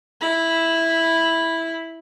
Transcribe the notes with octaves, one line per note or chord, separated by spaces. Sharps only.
E4 B5